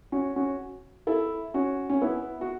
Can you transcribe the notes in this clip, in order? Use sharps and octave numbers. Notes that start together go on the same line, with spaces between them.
C#4 F#4
C#4 F#4
E4 A4
C#4 F#4
C#4
B3 E4
F#4